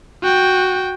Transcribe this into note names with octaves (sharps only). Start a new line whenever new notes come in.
F#4 G5